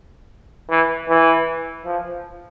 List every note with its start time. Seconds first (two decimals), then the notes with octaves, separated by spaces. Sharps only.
0.70 E3
1.08 E3
1.85 F3